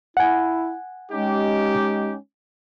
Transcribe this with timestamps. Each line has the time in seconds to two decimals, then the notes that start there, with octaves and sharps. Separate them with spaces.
0.17 E4 F#5 G#5
1.12 G#3 C#4 D#4 G4